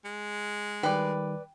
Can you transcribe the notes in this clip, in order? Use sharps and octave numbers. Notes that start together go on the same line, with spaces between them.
G#3
D#3 G3 B4 D5 G5